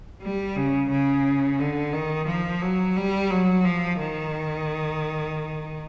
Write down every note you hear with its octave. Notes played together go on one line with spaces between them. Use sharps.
G3
C#3
C#3
D3
D#3
F3
F#3
G3
F#3
F3
D#3